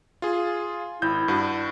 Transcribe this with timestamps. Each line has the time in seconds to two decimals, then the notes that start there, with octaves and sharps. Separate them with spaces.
0.22 F4 G#4
1.02 G#1 E4 G6
1.28 G2 F#4